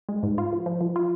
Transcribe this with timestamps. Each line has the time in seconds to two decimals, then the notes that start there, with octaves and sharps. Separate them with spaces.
0.09 G#3
0.23 G#2
0.38 F4
0.53 F3
0.66 F3
0.81 F3
0.96 F4